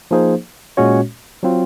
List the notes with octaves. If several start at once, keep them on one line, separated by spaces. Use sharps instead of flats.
F3 A#3 D#4 G#4 C5
A#2 G#3 C#4 F#4 C#5
F#3 C4 F4